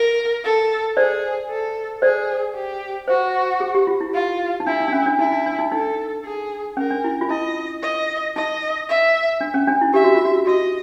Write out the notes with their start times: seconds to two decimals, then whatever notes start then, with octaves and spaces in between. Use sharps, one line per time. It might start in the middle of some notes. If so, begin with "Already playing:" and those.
Already playing: A#4
0.44 A4
0.97 G#4 C5 D5
1.50 A4
2.02 G#4 C5 D5
2.55 G4
3.08 F#4 C5
3.60 G#4
3.75 G4
3.87 F4
4.01 E4
4.14 F4
4.60 D#4
4.67 D4 E4
4.80 D#4
4.88 D4
4.93 C#4
5.06 D4
5.19 D#4 E4
5.32 D#4
5.46 D4
5.59 D#4
5.72 D#4 A4
6.25 G#4
6.77 C#4 A#4
6.90 D4
7.04 E4
7.21 F4
7.30 E4 D#5
7.83 D#5
8.36 D#4 D#5
8.89 E5
9.41 D4
9.54 C#4
9.67 D4
9.81 E4
9.94 G4 E5
10.04 F#4
10.15 F4
10.25 F#4
10.47 F#4 D#5